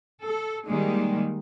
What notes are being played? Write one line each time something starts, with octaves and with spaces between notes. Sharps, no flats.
A4
D#3 G3 G#3 A#3